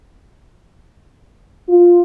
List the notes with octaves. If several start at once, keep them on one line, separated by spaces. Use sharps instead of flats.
F4